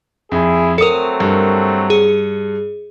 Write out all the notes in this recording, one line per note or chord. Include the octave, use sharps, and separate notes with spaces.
F2 E4 G#4
F#3 A3 C4 A4 A#4 D#6 C#7
G2
G#4